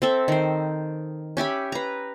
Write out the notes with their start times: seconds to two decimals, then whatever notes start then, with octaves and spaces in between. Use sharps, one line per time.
0.02 C4 A4 E5
0.28 D#3 C5
1.37 C#4 G4 E5 B5
1.72 B4 A#5